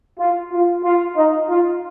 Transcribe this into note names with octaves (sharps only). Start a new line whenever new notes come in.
F4
F4
F4
D#4
F4